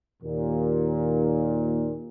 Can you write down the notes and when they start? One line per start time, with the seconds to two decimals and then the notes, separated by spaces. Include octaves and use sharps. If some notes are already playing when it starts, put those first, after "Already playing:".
0.23 D#2 A#2